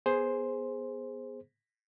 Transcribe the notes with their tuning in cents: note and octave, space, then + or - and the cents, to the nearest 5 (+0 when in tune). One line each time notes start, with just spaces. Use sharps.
B3 +0 G#4 +0 C5 +5